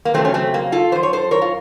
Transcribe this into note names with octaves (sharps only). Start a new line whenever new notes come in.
A#3
F2 C#3 F#3 A3 C4
C#4
A3 C4
A#3
F4 A4
F#2 F3 C5
C#5
A4 C5
A#4 C#5
F4